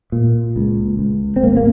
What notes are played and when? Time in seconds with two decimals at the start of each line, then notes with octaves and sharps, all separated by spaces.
0.12 A#2
0.56 C#2
0.99 C#2
1.36 C4
1.43 G#1 A#3
1.57 A#3